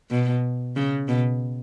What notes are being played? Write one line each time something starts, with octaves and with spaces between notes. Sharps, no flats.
B2
C#3
B2